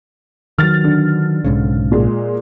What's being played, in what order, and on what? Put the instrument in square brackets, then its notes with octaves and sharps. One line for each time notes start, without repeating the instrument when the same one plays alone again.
[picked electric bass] D#3 F#3 [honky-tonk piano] F6 A6
[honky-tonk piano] D3
[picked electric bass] B1 G#2 C#3
[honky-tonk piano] A#2 G#3